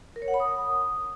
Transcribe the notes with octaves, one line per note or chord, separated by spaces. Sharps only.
A#4
C#5
F#5
B5
D#6